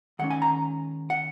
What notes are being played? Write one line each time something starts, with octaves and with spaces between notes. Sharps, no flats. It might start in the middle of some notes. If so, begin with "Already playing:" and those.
D#3 G#3 C#4 F#5
G#5
A#5
F#5